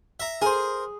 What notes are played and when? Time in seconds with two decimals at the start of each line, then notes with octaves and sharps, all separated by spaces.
0.20 E5 A#5
0.42 G#4 A#4 C5